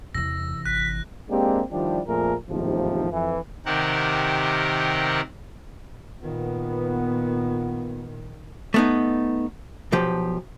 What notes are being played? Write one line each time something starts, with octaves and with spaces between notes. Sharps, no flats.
E2 C3 E3 E6 A#6
G#1 F#6 B6
G#3 A#3 C4 D4 G4
D#3 F3 G3 D4 E4 G4
F2 A#2 F3 A3 G#4 A#4
A1 D#2 G#2 C3 F3
F2 E3
C3 D#3 C4 G4 A#4 F#5
A#2 D#3 B3 F4
A3 B3 D#4
B1 F3 G4